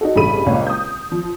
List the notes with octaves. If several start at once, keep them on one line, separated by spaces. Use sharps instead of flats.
D#4 F#4 A4
A1 G2 C#3 A3 B5 D#7
C#2 A#2 C#5
D#6 G6
F3